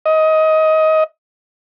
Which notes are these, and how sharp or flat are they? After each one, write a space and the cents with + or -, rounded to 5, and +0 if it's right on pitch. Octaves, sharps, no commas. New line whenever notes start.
D#5 +20